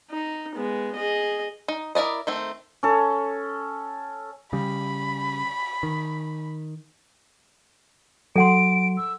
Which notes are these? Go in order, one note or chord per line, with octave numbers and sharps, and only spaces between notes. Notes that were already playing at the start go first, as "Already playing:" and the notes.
D#4
G#3 B3
G#4 D#5
D#4
E4 A#4 D5 D#5
D#3 A3 C4
C#4 A4
C#3 G3 B5
D#3
F#3 A4 F#5 C6 D7
E6